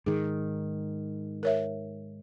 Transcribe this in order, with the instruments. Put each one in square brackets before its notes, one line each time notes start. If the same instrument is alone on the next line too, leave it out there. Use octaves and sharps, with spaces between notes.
[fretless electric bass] G#2 D#3 [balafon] G#4
[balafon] A#4 C#5 E5